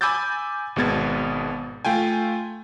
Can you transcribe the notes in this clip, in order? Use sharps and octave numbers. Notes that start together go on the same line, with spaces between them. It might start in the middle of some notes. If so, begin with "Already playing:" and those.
G#5 B5 D6 E6 G6 A6
G#1 B2 G#3 B3 G#6 A6
A3 F4 G5 G#5